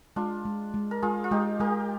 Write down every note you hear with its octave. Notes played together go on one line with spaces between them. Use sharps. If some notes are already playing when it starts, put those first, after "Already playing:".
G#3 D4 F4
G#3
G#3
A#4
G#3 F4 G#4
F4
G#3 D#4 G4
G#3 G4 A#4